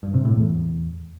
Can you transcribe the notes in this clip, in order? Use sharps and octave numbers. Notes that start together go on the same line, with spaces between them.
G2
C3
A2
E2